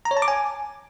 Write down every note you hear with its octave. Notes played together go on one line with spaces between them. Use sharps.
A#5
C#5
A5
D6
G#5